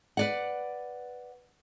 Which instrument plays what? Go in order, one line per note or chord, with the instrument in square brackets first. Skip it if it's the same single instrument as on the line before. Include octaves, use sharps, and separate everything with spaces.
[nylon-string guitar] B4 D5 F#5